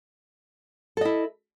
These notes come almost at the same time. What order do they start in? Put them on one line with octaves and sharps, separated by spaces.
A4 D#5 E4